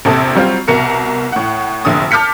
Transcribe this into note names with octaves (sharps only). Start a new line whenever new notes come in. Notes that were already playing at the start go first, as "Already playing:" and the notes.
A#1 E2 C3 A4 D#6
F#3 G3 C4 F4
C2 B2 A#4 C#7
A2 F#5
F1 A#1 D3 D#6
A5 D6 F6 G6 B6 C#7